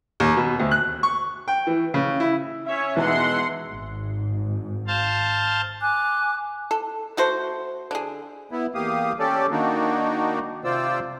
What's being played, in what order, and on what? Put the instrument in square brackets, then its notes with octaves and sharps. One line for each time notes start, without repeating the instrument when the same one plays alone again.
[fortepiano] D#2
B2
D2
F#6
C#6
G5
E3
C#3
E4
[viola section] C#4 C#5 [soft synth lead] E5
[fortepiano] E2 D#3 E3 [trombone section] B2 G#3 [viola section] F#5 C6
[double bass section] G#1 G#2
[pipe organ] C5 F5 A5
[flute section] G#5 D6 F#6
[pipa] A4
A3 F#4 A4 C5
D3 G#4
[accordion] B3 E4
E2 A#3 G4 F5 D#6
C#4 G4 A4 D5
D#3 A#3 D4 D#4 F#4
C3 F4 C5 D5 E6